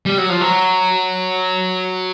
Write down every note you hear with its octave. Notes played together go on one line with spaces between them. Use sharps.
G3
F#3
F3
F#3